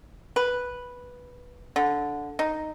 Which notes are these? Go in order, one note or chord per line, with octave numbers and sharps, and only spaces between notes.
B4
D3
D#4